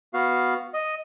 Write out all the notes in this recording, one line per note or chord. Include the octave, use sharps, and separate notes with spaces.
B3 F#4 F5
D#5